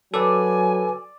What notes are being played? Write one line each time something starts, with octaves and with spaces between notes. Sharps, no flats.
F#3 A4 B4 D5 G#5 E6